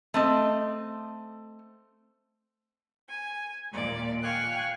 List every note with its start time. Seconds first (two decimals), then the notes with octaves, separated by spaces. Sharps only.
0.14 A3 C4 D#5
3.08 G#5
3.72 D#2 A#2 D5
4.23 F5 G5 G#5 C#6 F#6